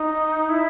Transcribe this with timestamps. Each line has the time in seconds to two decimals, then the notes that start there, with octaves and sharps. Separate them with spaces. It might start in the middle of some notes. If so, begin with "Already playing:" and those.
Already playing: D#4
0.49 E4